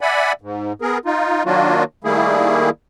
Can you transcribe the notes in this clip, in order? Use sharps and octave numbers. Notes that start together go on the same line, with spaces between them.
D5 E5 F#5 G#5 B5
G#2
B3 G#4 A#4
D#4 F4
D#3 F#3 A#3 D4 F4 F#4
D#3 G3 A3 A#3 E4 G#4